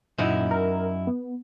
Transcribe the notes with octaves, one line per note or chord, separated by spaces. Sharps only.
F#2 A#2 D#4 E4
A#4
B3